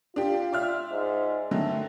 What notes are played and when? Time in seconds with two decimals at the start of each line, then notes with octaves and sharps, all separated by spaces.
0.16 D4 F4 G4
0.53 D5 E5 F6
0.92 G#2
1.51 D3 D#3 F#3 A3